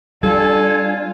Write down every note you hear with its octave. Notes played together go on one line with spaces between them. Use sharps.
G3 D4 F4 A4 G#5